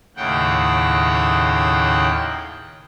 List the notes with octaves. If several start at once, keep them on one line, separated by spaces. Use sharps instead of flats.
D#2 A2 C#3 F#5 G5